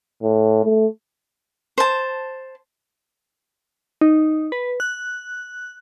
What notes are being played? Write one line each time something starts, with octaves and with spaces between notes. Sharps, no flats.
A2
A3
C5 A5
D#4
B4
F#6